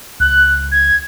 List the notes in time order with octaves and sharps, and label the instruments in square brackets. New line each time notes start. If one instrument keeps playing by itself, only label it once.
[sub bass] C#2 [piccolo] F#6
[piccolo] G#6